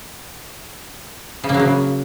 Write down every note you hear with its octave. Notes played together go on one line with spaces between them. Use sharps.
C#3
A#3
F#3
C#3